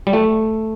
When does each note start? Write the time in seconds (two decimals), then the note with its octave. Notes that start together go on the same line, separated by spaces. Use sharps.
0.07 G3
0.13 A3